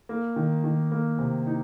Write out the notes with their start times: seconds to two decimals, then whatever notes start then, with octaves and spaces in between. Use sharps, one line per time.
0.09 A#3
0.36 D#3
0.64 D#3
0.92 A#3
1.18 C3
1.47 D#4